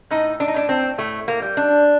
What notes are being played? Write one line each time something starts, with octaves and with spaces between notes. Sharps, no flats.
A2 D#4
D4
D#4
A2 D4
C4
A2 A3
A#3
G3
D4